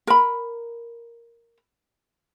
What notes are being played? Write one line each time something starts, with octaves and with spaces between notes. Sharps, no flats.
A#4 B5